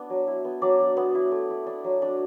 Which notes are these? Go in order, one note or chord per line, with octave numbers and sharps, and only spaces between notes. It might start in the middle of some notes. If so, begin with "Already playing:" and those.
Already playing: B3 D4 D6
F#3
E4
B3
F#3 D5 D6
D4
B3
E4
A3
E4
D4
F#3
D4